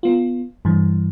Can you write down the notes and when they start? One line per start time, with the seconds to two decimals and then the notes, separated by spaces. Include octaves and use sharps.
0.03 B3 F4
0.65 G2 E3